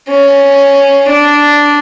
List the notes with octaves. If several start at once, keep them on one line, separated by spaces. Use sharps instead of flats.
C#4
D4